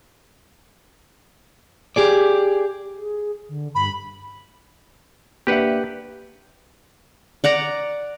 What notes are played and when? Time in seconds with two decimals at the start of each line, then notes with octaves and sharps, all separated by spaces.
1.96 G4 G#4 D5
2.97 G#4
3.49 D3
3.75 G2 B5
5.47 A#3 D4 G4 B4 E5 F#5
7.44 D5 F#5 A#5